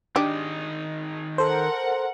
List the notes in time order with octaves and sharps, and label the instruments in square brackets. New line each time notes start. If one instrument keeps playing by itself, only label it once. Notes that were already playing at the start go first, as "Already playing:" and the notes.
[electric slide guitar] D#3 G#4 D#5 [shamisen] D4 G4
[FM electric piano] A4 C5 [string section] A#4 F#5